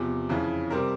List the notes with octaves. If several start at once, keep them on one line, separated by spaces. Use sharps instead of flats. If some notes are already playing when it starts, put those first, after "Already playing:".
Already playing: E2 C3 F3
F2 C#3 E3
C3 G3 C4 G4 A#4